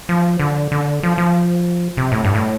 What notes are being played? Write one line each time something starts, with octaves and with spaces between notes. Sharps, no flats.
F3
D3
D3
F3
F3
C3
A2
G2
A2